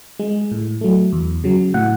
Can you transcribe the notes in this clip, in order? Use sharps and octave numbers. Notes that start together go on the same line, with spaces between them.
G#3
A2
F#3 A3
E2
C#3 F#3
A2 F#5